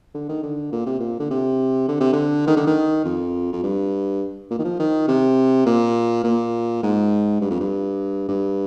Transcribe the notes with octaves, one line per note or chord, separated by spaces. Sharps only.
D3
D#3
D3
A#2
C3
A#2
D3
C3
D3
C3
D3
D#3
D3
D#3
F2
F2
G2
A#2
D#3
F3
D#3
C3
A#2
A#2
G#2
G2
F2
G2
G2